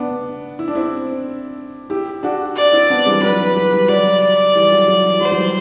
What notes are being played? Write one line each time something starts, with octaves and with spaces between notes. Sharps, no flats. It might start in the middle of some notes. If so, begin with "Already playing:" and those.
Already playing: B3 D4
E4
D4
C4 E4
E4 G4
D4 F#4
D5
C4 E4
B3 D4
E3 G3
F#3 B4
E3
F#3
E3 G3
F#3 D5
E3 G3
F#3
F#3
E3
F#3 C5
F#3
E3 G3